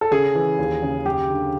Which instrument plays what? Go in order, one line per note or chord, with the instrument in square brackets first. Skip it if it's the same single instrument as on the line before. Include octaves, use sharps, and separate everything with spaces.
[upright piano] A4
C#3 G#4
E3
D#2
C#3
F#2 G4
D3